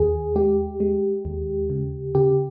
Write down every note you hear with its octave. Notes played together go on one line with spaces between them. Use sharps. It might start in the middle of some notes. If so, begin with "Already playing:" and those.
Already playing: D#2 G#4
G#3 G4
G#3
D#2
C#3
C#3 G4